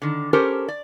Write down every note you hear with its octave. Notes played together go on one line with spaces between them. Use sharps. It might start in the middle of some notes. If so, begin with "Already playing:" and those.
D3 D#3
C#4 G4 A4 A#4 C5
D5